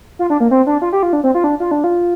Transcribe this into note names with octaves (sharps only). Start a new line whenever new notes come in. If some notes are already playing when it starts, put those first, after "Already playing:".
F4
D4
A#3
C4
D4
F4
G4
F4
D4
C4
F4
D4
F4
D4
F4